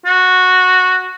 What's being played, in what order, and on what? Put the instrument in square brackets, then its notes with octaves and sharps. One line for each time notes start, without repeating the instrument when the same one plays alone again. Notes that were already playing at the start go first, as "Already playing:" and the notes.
[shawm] F#4